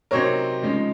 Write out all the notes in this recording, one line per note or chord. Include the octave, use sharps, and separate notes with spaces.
C3 F#3 C4 D#4 A#4 C#5
C#3 F3 G#3 D#4